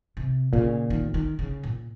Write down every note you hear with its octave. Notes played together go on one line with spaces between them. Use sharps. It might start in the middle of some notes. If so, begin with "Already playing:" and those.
C3
A#2 C#3
D#3
D#3
C#3
A#2